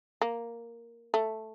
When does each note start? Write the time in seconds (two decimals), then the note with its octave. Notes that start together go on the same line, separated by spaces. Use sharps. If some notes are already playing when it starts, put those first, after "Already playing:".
0.21 A#3
1.14 A3